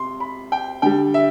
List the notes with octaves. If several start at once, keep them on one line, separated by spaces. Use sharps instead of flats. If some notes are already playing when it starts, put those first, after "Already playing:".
Already playing: C3 C6
B5
G5
D3 G3 G5
E5